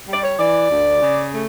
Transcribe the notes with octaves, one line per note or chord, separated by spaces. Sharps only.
G3 D5
C#5
E3 D5
D2
C#3
A3